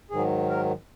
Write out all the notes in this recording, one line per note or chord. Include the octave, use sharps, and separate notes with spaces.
G#2 D#3 F#3 G#4
A#4